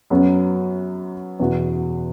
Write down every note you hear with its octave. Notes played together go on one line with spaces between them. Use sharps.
F#2 F#3 B3 F#4
E2 B2 B3 F#4